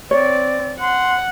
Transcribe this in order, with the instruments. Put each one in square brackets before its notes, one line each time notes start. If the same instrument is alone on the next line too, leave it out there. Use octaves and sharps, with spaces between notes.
[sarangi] C4 [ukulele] C#5 [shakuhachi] D5
[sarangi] F#5 [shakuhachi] C6